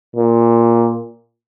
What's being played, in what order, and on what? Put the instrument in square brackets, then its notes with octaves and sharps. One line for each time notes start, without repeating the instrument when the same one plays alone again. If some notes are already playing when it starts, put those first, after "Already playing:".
[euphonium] A#2